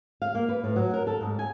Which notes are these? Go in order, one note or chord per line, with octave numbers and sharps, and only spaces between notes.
F5
A#3
B4
A2
F#3
A#4
A4
G#2
G#5